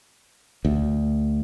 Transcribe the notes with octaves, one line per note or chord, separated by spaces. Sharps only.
D2